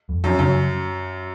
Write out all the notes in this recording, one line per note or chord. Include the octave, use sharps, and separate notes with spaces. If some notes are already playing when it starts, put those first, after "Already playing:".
F2
F#2 F3
F#2 C#3